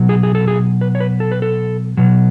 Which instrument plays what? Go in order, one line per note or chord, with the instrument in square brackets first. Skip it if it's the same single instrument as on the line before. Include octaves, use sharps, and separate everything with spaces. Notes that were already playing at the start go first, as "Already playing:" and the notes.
Already playing: [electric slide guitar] B2 F#3
G#4
G#4
A4
G#4
B4
C#5
B4
A4
B4
A4
B2 F#3